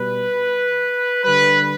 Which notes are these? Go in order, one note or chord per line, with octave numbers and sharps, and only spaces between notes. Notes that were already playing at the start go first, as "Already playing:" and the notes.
Already playing: B2 G3 B4
D3 G3 B4